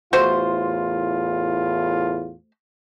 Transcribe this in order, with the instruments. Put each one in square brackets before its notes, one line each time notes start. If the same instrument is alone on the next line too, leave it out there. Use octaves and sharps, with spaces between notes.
[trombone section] E2 A2 F4 [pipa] A3 F#4 C5